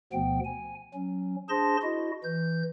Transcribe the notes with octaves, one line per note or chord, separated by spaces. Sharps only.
D2 B2 F3 B3 G5
G#5
F#3 C#4
D4 G#4 C5 A5 C6 A#6
E4 F#4 D#5
E3 G6